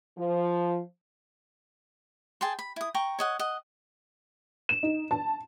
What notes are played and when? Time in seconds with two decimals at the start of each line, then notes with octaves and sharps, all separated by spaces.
0.17 F3
2.41 G#4 G5 A5 C6
2.59 B5
2.76 E4 D#6
2.94 G5 A#5 C#6
3.19 C#5 D#5 F#5
3.39 D#5 F#5
4.69 E7
4.83 D#4
5.11 A5